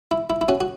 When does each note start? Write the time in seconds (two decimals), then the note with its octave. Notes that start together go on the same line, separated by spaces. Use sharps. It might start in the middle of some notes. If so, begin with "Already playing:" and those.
0.11 E4
0.30 E4
0.41 E4
0.48 C#4 F#4
0.61 F#4